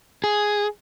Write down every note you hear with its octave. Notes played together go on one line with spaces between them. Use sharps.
G#4